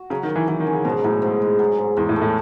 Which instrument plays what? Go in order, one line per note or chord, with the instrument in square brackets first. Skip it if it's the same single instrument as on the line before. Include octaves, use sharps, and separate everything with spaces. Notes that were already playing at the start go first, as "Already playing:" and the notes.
Already playing: [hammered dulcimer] F#4
[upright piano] C#3 [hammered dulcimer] F#3
[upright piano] D#3
[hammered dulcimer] F#3
[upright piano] E3
[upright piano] E3 [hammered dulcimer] F#3
[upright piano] D#3
[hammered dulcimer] C#4
[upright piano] C#3
[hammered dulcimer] G#2 [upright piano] B2
[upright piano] A2 [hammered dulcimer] F#3
[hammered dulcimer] G#2
G#2
F#3
G#2
[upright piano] E2 [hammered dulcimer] G#2
[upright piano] A2
[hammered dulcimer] A3
[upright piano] A2